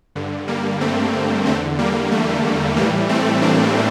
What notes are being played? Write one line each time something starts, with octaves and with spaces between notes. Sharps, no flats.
G2 D3
G3 A#3
A3 C4
E2 D3 A3 C4
G3 A#3
A3
A2 E3 G3 A#3
A3 C4
A#3 D4